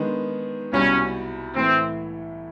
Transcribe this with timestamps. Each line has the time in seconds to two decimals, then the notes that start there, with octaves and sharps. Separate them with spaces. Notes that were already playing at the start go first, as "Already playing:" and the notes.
Already playing: D#3 G#3 B3 D4
0.73 C2 B2 G3 C#4
1.56 A2 E3 A3 C4